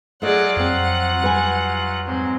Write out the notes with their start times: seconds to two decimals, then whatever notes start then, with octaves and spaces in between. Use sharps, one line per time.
0.22 F#3 A3 F4 G#4 D5 D#5 F#5
0.57 F2 F3 C4 F#5
1.22 G3 B4 G#5
2.06 G#2 F#3 G#3 C4